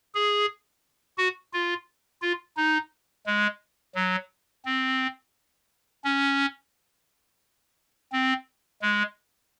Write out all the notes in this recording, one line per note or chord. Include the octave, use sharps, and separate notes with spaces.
G#4
F#4
F4
F4
D#4
G#3
F#3
C4
C#4
C4
G#3